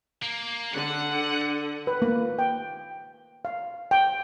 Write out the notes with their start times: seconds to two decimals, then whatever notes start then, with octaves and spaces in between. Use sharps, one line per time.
0.23 A#3
0.74 D3 F#5
1.87 B4
2.02 A#3
2.39 G5
3.45 F5
3.91 G5